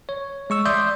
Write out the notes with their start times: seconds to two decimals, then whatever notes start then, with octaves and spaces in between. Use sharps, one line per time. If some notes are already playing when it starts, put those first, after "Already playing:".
0.09 C#5
0.50 G#3 C#6 E6
0.66 D5 E5 C6 D6 D#6 G6